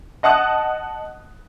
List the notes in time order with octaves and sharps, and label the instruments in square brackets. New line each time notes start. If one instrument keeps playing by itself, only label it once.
[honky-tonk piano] D#5 F#5 A5 D#6 F#6